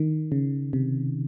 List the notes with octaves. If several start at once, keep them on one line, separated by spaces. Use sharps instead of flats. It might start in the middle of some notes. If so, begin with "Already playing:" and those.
Already playing: D#3
C#3
C3